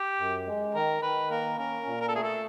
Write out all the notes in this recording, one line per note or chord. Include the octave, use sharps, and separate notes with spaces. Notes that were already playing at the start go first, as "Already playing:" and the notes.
Already playing: G4
F#2
G#3
D#3 A#4
D#3 B4
A#3 A#4
C#4 A#4
A#2
A#4
A4
A3 G#4
A4